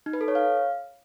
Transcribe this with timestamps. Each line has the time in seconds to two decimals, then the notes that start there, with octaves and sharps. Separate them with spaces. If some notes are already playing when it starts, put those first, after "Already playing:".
0.06 D#4
0.13 B4
0.21 A4
0.28 C#5
0.35 F5